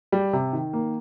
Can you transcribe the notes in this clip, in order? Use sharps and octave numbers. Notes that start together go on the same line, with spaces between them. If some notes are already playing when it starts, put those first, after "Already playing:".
G3
C3
D#3
A#3